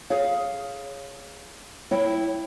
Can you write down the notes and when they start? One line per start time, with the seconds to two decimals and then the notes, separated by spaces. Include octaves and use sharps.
0.10 G#4 C#5 F5
1.91 E4 C#5 G5